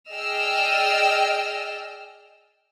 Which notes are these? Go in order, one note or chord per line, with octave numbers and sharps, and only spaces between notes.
G#4 D5 D#5 G5 E6 F6